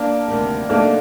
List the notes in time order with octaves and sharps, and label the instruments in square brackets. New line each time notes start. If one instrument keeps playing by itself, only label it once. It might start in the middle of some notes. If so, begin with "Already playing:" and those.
Already playing: [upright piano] A#3 D4
[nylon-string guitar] D2 C3 D#3 G3
[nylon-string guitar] C3 F#3 A3 D#4 A4 [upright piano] A#3 D4